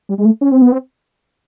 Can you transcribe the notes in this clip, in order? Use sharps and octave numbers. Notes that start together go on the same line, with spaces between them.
G3
G#3
A3
C#4
C4
B3
C4